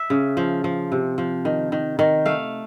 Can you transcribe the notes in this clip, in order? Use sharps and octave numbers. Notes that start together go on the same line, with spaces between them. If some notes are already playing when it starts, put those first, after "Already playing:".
Already playing: E5
C#3
F3
F3
C3
F3
D#3
D#3
D#3
A3 F5